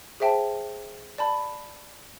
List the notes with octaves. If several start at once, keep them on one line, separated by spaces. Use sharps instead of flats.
G#4 C5 E5 G5 A5
D5 A5 B5